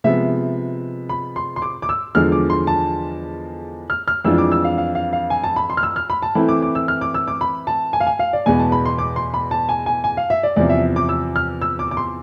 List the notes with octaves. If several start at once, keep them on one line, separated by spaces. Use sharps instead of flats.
C3 F3 G#3 B3 E5
B5
C6
C6
D6
D6
E6
E2 D3 F3 G#3 F6
D6
C6
A5
F6
F6
F2 E3 G#3 D4 F4 E6
D6
E6
F5
F5
F5
F5
G#5
A5
B5
C6
F6
E6
F6
B5
A5
E3 A3 C4 E4 B5
D6
D6
E6
F6
D6
E6
D6
B5
A5
G#5
F5
G#5
F5
D5
E2 B2 G#3 B3 G#5
A5
B5
C6
D6
C6
B5
A5
G#5
G#5
G#5
F5
E5
D5
E2 C3 F3 D5
E5
D6
E6
F6
E6
D6
D6
C6